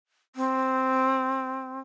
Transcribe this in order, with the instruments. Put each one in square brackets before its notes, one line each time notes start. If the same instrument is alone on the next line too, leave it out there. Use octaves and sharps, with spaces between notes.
[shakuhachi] C4